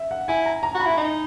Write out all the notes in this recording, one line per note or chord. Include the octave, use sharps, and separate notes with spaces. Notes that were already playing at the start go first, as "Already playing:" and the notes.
Already playing: E5
F#5
E4 G#5
A#5
A#5
F#4
B5
E4
D#4